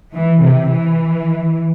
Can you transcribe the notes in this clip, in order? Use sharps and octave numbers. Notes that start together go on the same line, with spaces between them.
E3
C3
E3